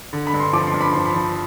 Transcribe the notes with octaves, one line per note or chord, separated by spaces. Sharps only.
D3
B5
G2
C6
F3 D6
C6
G2
B5
F3 C6
B5
F3